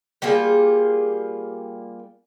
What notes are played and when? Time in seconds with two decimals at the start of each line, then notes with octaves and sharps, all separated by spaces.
0.22 G3 A#3 F4 G#4